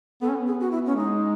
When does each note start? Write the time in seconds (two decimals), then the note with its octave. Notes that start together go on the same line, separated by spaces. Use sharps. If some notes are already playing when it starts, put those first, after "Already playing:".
0.22 B3 A4
0.29 C#4
0.36 B3
0.47 G#4
0.60 F#4
0.71 E4
0.86 C#4
0.96 G#3 D#4